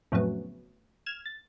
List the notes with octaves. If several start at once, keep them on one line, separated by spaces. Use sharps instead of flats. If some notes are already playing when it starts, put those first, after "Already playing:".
F2 A2 C#3 F#3 B3
F6 G#6 E7
A6